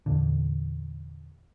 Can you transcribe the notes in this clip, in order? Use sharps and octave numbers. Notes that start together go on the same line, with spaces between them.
E2 A#2 D3